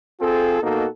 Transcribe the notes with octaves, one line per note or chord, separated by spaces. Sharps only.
C4 F4 G#4 A4
B2 A#3 D#4 F#4 A4